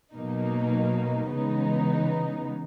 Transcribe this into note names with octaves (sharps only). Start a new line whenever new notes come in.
B2 F#3 A#3 D#4
C#3 E3 G#3 B3 D#4